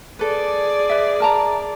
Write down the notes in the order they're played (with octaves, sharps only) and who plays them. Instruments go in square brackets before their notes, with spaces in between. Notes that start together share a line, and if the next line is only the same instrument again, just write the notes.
[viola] G#4 D5 [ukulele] A4 B4
[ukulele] B4 E5
A#4 A5 A#5